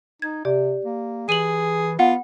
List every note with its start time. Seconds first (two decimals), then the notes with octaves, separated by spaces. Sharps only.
0.22 D#4 G#6
0.45 C3 G4 D5
0.85 A#3
1.29 E3 G#4 D#7 F#7
1.99 B3 F4 F#5